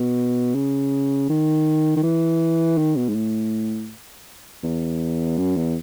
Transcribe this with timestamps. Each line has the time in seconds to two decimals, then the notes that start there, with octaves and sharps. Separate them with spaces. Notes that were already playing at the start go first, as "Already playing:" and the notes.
Already playing: B2
0.55 C#3
1.29 D#3
1.96 D#3
2.03 E3
2.78 D#3
2.96 B2
3.08 G#2
3.15 A2
4.63 E2
5.38 F#2
5.56 E2